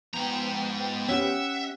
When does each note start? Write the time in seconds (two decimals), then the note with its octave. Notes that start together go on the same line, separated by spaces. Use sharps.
0.13 G#2 F3 B3 G5 A#5
1.08 C#4 G4 E5 F#5